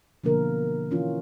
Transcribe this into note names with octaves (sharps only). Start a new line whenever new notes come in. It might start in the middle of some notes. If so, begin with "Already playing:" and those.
B2 D3 F3 A#3 A#4
E3 C#4 F4